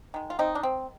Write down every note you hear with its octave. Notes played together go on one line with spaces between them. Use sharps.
D#3 G#3
F4
C4 D#4
D4
C4